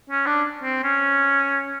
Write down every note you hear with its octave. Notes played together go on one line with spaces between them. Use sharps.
C#4
D4
C4
C#4